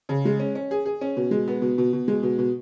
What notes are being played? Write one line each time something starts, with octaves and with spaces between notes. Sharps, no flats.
C#3
G#3
C#4
C#4
G#4
G#4
C#4
B2
G#3
B3
B2
B2
B2
G#3
B2
B2